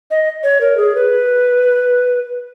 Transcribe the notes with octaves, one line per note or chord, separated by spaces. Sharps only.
D#5
C#5
A#4
G#4
B4